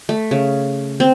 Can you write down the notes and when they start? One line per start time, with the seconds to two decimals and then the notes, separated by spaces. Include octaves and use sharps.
0.09 A3
0.31 C#3
1.00 C4